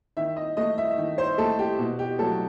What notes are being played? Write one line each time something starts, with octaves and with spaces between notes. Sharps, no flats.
D#3 E5
D#5
A3 D#5
E5
D#3
C5
A3 A4
G4
B2
G4
F#3 A3 A4